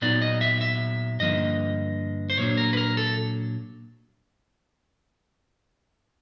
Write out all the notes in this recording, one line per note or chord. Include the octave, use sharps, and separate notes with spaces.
A#2 F#3 B3 D#4 D5
D#5
E5
E5
G2 D3 F3 A#3 D#5
C5
A#2 F#3 A#3 D4 C#5
A#4
B4
A#4
A4